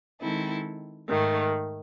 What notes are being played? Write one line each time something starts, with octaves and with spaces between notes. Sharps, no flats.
D#3 G#3 C4 E4 A4
G#2 D#3 A3